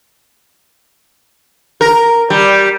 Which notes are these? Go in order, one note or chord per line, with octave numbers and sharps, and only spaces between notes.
A#4
G3